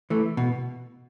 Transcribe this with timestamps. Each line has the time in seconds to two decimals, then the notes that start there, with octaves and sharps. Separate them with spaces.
0.10 E3 A3
0.37 B2